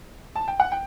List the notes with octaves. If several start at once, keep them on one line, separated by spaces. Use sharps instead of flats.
A5
G5
F#5
G5